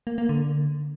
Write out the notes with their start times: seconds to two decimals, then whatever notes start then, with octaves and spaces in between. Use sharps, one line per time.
0.07 A#3
0.18 A#3
0.29 D3